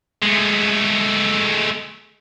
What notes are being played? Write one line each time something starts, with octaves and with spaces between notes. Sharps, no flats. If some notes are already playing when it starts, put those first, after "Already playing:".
G#3 A3